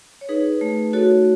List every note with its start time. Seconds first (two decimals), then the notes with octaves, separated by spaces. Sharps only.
0.21 C#5
0.29 D#4 G#4 B4
0.61 A3
0.93 F#4 A4 C#5